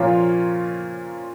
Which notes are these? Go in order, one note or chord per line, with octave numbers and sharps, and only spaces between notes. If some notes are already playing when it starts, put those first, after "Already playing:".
Already playing: A#2 F3 A#3 C#4 F4 C#5